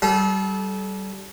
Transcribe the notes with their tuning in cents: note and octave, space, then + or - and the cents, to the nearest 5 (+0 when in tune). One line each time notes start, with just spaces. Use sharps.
G3 -25 A4 -35